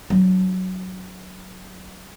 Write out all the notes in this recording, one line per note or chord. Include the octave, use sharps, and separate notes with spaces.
F#3 D4